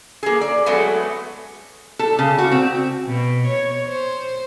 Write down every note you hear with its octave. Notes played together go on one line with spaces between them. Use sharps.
A#3 G#4
D5
F#3 G#3 A3 B3
A4
C#3
F#4
C4
B2
C#5
C5